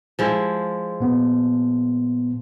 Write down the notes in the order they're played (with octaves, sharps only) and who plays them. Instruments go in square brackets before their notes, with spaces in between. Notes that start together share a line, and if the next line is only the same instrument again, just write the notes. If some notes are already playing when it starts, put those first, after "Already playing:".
[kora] F3 G#3 E4
[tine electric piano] A#2 B3